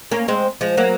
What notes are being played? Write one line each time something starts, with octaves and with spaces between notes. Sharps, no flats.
A#3 C#4
G#3 C4
F3 G#3
F#3 A#3